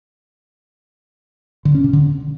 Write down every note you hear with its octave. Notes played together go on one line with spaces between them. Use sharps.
D3
C#4
C3
D3